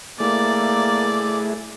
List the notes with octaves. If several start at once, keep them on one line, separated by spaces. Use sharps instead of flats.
A3 A#3 E4 G#4 D5